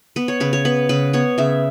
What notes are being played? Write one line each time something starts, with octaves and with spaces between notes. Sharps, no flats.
B3 B4
C#5
C#3 B4
C#5
B3 B4
C#3 B4
B3 C#5
C#3 E5